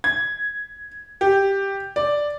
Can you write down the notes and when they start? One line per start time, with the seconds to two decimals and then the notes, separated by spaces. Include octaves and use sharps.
0.04 G#6
1.21 G4
1.96 D5